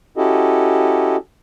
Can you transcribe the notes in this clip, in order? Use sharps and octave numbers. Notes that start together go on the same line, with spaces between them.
C#4 E4 F#4 G4 A4 D#5